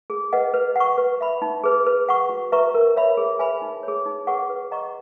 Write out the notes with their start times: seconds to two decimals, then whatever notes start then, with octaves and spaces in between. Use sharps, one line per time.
0.10 G#4
0.33 B4 D#5 F#5
0.54 B4
0.76 F#5 C#6
0.98 B4
1.21 E5 B5
1.42 D#4
1.64 G#4 B4
1.86 B4
2.09 F#5 C#6
2.29 F#4
2.52 B4 E5 A#5 C#6
2.74 A#4
2.96 C#5 E5 B5
3.17 G#4
3.39 B4 E5 G#5 B5
3.62 D#4
3.83 G#4 C#5
4.06 D#4
4.27 G#4 B4 F#5 C#6
4.50 B4
4.71 D#5 F#5 A#5 C#6